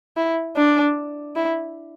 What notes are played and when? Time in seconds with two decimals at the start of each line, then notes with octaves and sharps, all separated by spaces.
0.17 E4
0.56 D4
1.36 E4